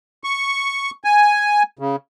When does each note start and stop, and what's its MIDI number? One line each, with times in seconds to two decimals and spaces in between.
0.24 0.91 85
1.04 1.63 80
1.79 1.96 49